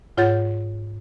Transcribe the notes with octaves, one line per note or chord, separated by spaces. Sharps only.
G#2 F4 C#5 F#5 G6 A6